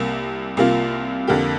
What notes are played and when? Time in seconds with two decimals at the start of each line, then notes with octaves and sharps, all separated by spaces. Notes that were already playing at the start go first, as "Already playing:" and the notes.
Already playing: C2 C3 A#3
0.57 C2 C3 A#3 F4
1.27 F2 D3 A#3 G4